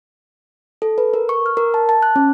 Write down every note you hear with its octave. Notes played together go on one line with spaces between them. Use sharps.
A4
B4
A#4
C#6
F6
A#4
A5
A5
F#6
C#4